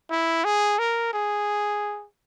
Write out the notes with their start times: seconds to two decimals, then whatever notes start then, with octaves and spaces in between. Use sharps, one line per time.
0.10 E4
0.45 G#4
0.79 A#4
1.13 G#4